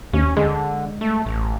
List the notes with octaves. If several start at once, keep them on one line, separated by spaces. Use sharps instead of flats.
D#2 C#4
D3 G#3
A3
A1